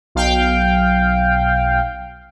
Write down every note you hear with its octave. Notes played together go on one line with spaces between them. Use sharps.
B1 F5 G5